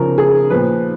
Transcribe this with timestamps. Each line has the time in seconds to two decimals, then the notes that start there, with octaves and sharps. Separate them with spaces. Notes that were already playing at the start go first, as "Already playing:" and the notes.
Already playing: C#3 F3 A#4
0.18 G#4
0.50 A#2 F3 B4